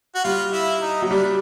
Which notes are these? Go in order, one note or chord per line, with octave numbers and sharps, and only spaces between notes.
F#4
G3 F4
E4
D#4
F#3
G3 D4